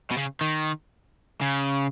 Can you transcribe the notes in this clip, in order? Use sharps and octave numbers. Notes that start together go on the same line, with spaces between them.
B2
C#3
D#3
C#3